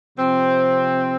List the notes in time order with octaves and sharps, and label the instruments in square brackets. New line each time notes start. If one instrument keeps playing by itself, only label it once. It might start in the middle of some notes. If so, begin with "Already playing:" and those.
[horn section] C3 F3 C4